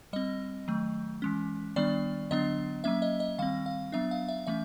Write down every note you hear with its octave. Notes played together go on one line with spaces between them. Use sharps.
G3 C4 D#5
D#3 F#3 A3
E3 G#3 C#4
D#3 G3 B3 D4 D5
D3 F#3 B3 D4 D#5
F#3 A#3 C#4 E5
D#5
D#5
D#3 G3 C4 F5
F5
F#3 B3 D4 E5
F5
E5
E3 A3 C#4 E5